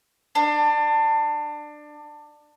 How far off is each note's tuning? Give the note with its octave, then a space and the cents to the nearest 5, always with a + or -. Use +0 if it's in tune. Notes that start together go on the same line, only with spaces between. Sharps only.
D4 +20